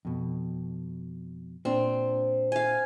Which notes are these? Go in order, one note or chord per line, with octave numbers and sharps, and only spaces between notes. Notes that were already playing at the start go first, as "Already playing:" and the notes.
F2 B2
A#2 C4 D4
F5 G#5